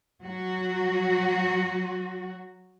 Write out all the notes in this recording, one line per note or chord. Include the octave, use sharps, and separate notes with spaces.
F#3 F#4